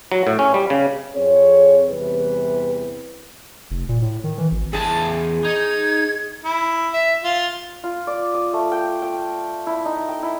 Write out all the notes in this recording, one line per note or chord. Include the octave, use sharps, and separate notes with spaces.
F#3
A2
C#4
G3
C#3
F2 C4 G#4 C#5
E2 C3 E3 G3 B4
F1
A#2
A2
D#3
E3
G#1
E2 G#4 A5
D#4 G#6
E4
E5
F4
F4
D5
D#6
A3
G5
G5
E4
D#4
G5
E4